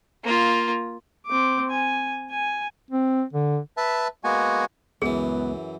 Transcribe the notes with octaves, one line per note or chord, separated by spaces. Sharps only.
A#3 F4
C4 D6
G#5
G#5
C4
D3
B4 E5 A5
G#3 A#3 B3 F#4 F#5 G#5
C#2 F#2 E3 G#3 B3 G#4